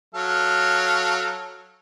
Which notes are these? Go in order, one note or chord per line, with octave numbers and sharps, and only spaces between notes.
F#3 A4 F5